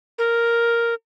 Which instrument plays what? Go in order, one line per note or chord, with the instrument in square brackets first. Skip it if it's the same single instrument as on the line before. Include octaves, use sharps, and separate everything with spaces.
[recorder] A#4